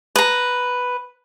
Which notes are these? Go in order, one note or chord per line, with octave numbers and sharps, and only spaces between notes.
B4 A#5